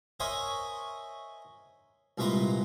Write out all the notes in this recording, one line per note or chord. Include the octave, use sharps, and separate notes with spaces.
A#4 C5 C#5 D#5 E5 G#5
C2 A#2 G#3 B4 A#5 C6